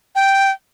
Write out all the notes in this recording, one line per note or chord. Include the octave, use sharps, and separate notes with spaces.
G5